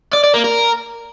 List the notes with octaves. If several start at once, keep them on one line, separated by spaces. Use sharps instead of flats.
D5
D5
A#3
A#4